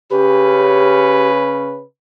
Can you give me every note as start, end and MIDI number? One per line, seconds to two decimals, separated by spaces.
0.10 1.84 49
0.10 1.84 61
0.10 1.29 67
0.10 1.84 71